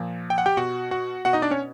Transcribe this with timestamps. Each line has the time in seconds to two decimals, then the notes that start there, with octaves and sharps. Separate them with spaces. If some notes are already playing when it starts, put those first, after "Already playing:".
Already playing: A#2 F3
0.30 G5
0.38 F#5
0.46 G4 G5
0.57 B2 F#4 F#5
0.91 F#4 F#5
1.25 B2 F#4 F#5
1.33 D#4 D#5
1.42 D4 D5
1.51 C#4 C#5